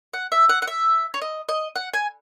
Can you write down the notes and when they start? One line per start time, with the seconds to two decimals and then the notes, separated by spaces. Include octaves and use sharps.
0.13 F#5
0.32 E5
0.49 F#5
0.62 F#5
0.67 E5
1.14 C#5
1.22 D#5
1.49 D#5
1.76 F#5
1.94 G#5